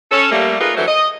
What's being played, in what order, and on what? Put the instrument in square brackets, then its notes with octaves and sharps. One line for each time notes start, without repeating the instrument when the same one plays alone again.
[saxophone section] C#4 A4
G3 A3 A#3
A3 D#4 F4 G#4 A#4 B4
D3 E3 F#3 A3 C5 C#5
D#5